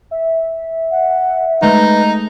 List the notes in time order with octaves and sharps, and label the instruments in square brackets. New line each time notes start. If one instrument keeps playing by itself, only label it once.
[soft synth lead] E5
[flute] F#5
[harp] G#3 A3 G6 [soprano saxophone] D#4 [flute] B4